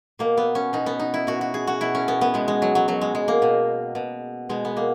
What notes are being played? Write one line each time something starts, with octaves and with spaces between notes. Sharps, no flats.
B2 A#3
B3
C#4
B2 D#4
B3
D#4
E4
B2 F#4
F#4
G#4
F#4
B2 E4
C#4
B3
B3
B2 G#3
G#3
F#3
F#3
B2 F#3
G#3
G#3
A#3
B2
B2
B2 G#3
B3
A#3